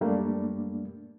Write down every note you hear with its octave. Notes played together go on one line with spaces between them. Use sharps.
F#2 G3 A3 A#3 D4